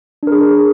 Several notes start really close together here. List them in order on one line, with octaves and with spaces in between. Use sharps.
D4 A#4 G#4